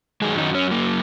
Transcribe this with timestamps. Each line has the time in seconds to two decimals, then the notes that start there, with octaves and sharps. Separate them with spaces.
0.21 F#2 D#3 F#3 G#3 G#4
0.38 D#3 D#4
0.55 C#4
0.71 A#3